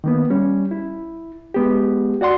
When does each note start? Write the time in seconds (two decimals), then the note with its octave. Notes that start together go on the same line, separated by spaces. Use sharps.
0.04 D#3 A#3 B3
0.30 G3 C#4
0.71 E4
1.54 G#3 B3 G4
2.21 F#4 D5 F#5 C6